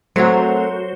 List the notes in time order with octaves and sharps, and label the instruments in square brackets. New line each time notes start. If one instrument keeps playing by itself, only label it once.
[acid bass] F#3 [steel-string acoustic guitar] A3 C4 A#4 [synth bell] F#4 C5